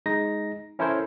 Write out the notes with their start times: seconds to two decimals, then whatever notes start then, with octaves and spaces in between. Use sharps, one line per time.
0.06 G#3 D#4 A#6
0.79 C#4 E4 A4 A#4 C5 C#5